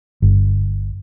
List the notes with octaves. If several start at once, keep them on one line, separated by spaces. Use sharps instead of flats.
G1